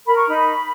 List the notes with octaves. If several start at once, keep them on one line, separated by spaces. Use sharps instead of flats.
A#4 B5
C#6
D#4 B5